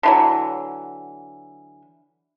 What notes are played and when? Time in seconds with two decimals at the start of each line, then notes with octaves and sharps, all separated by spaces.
0.03 D3 E3 F#3